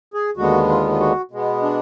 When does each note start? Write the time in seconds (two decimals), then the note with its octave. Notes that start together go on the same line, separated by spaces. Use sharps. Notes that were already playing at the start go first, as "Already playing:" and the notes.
0.14 G#4
0.37 D#2 D3 G#3 B3 F#4
0.69 F4
0.91 F4
1.00 F#4
1.31 B2 G#3 B3
1.62 D4